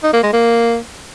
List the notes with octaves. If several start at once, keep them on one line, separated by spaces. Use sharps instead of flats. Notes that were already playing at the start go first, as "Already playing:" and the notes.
D#4
A#3
G#3
A#3